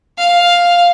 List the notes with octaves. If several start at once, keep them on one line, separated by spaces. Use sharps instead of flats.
F5